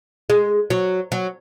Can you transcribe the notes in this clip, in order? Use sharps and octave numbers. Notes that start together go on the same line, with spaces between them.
G#3
F#3
F#3